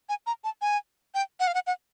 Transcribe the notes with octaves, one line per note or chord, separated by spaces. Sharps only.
G#5
A#5
A5
G#5
G5
F#5
F5
F#5
F#5